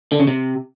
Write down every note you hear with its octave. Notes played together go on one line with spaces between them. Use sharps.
D3
C#3
C3